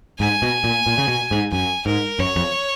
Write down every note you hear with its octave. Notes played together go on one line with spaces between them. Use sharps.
G#2 G#5
B2
A#2
A#2
C#3
B2
G#2
F#2 G#5
G#2 A#4
F#2 C#5
F2